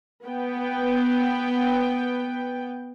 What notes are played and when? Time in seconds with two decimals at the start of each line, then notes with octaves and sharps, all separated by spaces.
0.24 B3 G5